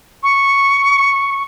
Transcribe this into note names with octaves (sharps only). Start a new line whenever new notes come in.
C#6